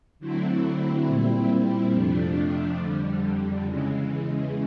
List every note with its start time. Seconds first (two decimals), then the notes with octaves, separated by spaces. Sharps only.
0.19 D3 F#3 A3 C4 E4
1.06 A#2 G3 C4 E4
1.91 F2 C3 F3 A3 D4
2.77 F2 D3 G3
3.62 E2 C#3 E3 G#3